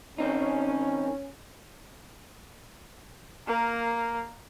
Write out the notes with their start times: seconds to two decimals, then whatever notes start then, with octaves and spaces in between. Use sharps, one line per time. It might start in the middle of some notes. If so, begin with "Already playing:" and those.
0.18 D#3 C4 C#4 D#4
3.47 A#3 A#4